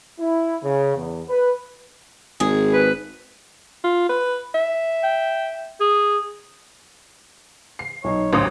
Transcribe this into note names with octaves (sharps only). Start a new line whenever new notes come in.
E4
C#3
E2
B4
G#1 G#4
B4
F4
B4
E5
G5
G#4
C7
B1 D#4 C#5
A1 D2 C5 D#6